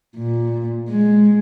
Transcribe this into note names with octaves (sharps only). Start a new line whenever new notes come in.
A#2
G#3